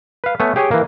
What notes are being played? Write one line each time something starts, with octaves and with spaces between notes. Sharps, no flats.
B4 F5
A3 B3 C#5 G#5
G4 G#4 C#5 G5 G#5
E3 A#3